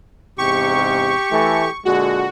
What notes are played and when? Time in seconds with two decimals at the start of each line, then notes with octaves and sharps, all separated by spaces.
0.38 E2 G#2 C3 G4 C#6
1.30 E3 A3
1.85 A#2 D3 G#3 F#4